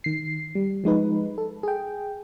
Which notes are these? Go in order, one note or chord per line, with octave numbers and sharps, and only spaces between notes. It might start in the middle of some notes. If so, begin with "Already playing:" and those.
D#3 C7
G3
F3 G#3 D#4 B4
A4
G#4 G5